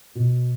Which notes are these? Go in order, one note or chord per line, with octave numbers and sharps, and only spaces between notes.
B2